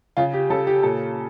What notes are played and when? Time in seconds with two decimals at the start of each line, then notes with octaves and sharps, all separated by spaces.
0.17 C#3 F4
0.33 G4
0.50 C#3 A4
0.67 G4
0.83 A#2 A4